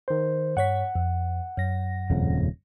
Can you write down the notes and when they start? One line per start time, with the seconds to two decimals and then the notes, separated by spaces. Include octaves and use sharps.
0.08 D#3 C5
0.57 G2 C#5 F#5 B6
0.95 F2
1.57 F#2 A#6
2.10 D#1 F2 C#3